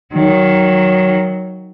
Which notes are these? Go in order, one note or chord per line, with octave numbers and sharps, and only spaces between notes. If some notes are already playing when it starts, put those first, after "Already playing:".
D#3 F#3